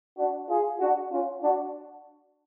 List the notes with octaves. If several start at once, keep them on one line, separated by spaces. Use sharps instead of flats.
D4 F#4
F4 G#4
D4 F#4
C#4 F4
D4 F#4